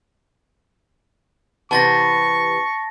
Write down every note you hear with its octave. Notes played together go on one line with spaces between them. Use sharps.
C3 E3 B3 A5 C#6 A6 A#6